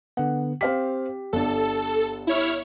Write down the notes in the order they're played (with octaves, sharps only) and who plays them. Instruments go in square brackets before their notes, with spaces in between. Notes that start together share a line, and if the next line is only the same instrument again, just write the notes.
[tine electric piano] D3 B3 [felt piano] F#5
[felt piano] C4 F5 B6 [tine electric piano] G4
[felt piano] G1 D4 [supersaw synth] A4
[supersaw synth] E4 C#5 F6